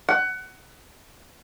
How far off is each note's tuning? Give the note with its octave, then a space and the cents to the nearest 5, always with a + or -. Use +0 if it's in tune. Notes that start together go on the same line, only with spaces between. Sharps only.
F#5 +20